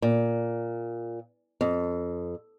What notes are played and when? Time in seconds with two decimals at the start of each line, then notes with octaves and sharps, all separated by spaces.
0.02 A#2
1.61 F2